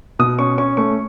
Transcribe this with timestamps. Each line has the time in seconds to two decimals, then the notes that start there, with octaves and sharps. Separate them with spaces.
0.19 B2 D#6
0.39 C#4 C#6
0.58 C#4 C#6
0.77 A3 C#6